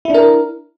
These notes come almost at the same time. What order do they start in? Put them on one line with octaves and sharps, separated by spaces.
E4 D4 A#4